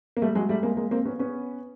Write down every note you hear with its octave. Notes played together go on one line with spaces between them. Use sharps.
A#3
G3 A3
F#3 G#3
G3 A3
G#3 A#3
G#3 A#3
A#3 C4
B3 C#4
B3 C#4